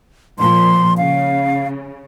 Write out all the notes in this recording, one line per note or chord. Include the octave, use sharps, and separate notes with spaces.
A#2 F3 C6
C#3 F5